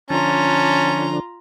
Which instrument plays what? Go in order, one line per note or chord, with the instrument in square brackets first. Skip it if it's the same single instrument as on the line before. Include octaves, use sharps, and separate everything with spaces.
[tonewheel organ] D3 F3 D4 [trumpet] C#4 [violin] F4 A#5 [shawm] A5